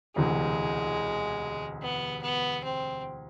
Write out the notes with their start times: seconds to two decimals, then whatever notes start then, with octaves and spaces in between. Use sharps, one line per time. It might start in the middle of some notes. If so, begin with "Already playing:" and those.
0.16 E1 D2 C3 E3 G#3
1.82 B3
2.22 B3
2.64 C4